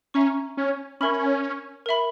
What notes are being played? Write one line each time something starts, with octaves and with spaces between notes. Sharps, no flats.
C#4 E5 A#5 C#6
C#4
C#4 A#4 E5 B5
A#4 E5 B5